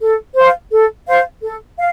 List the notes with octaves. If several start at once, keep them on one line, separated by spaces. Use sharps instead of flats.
A4
C5
F5
A4
C5 F5
A4
F5